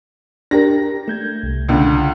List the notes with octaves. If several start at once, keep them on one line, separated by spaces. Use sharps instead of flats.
D4 G4 A#4 A#6
A3 G6 G#6
C2
C#2 D3